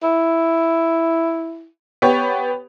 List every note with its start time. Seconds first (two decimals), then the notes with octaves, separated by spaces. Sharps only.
0.03 E4
2.02 B3 G4 C#5